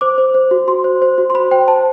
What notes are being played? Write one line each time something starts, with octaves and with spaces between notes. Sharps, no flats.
C5 D6
C5
C5
F#4
F#4 C6
C5
C5
F#4
C6
C5 B5
C5 G5
C5 A5